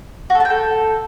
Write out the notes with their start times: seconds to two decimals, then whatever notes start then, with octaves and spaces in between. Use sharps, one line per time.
0.30 F#4
0.35 A4
0.40 A5
0.45 G5
0.50 A4